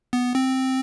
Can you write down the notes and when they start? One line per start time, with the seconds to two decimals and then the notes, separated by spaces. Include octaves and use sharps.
0.13 B3
0.35 C4